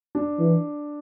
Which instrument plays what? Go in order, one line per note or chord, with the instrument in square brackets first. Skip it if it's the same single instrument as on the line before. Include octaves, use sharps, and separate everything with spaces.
[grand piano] D4
[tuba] E3